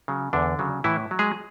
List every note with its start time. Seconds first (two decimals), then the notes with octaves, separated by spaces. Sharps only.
0.08 C#3 F#3
0.33 E2 D3 D4
0.59 C#3 F#3
0.84 A2 E3 E4
1.11 F#3
1.19 G#3 G#4